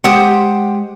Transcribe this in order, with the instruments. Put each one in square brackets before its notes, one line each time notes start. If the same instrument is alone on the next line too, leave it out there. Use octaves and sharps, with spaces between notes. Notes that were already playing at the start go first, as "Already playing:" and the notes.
[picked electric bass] G#3 [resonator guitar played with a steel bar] G4 C5 [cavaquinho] F#5 D#6